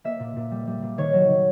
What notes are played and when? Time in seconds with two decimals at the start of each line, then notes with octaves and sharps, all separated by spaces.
0.04 A#3 E5
0.20 A#2
0.36 A#2
0.51 G3
0.67 G3
0.82 A#2
0.98 D#3 C#5
1.13 F#3
1.29 D#3